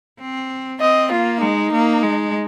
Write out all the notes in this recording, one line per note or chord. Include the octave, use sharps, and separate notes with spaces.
C4
C4 D#5
A#3 F4
G#3 D#4
A#3
G#3